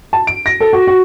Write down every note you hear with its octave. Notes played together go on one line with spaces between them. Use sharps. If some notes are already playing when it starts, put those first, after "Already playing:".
A5
D7
A#6
A4
F#4
F#4